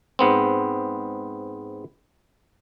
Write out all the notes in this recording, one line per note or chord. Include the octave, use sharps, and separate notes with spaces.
G#2 B3 C4